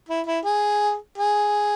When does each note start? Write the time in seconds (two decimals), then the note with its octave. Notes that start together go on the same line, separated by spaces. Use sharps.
0.09 E4
0.26 E4
0.44 G#4
1.18 G#4